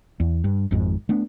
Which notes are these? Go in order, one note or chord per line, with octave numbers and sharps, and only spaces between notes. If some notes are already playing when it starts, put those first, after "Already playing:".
E2
G2
G#1 F2 G#2
A3 B3 D4